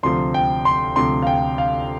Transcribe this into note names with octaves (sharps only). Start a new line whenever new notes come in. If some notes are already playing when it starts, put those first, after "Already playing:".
D2 C3 F3 C6
G5
C6
D2 C3 F3 C6
F5
G5
F5